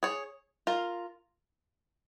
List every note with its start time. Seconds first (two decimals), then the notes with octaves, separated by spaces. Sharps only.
0.03 G#4 C#5
0.67 F4 A#4